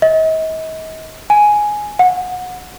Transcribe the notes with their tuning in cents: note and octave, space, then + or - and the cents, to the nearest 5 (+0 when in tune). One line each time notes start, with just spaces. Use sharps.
D#5 +40
G#5 +5
F#5 -25